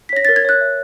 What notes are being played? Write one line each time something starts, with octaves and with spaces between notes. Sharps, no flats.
B6
C#5 A#6
A#4 A6
G#6
C#5 F#6
E5